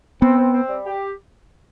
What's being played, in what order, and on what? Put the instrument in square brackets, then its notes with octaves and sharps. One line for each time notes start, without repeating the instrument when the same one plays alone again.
[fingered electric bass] B3 [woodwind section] C4
[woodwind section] C4
C4
G3
G4